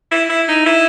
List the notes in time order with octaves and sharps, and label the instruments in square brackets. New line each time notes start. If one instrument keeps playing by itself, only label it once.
[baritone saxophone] E4
E4
D#4
E4